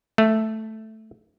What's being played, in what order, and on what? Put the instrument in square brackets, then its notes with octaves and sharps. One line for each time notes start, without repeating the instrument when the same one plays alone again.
[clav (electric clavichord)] A3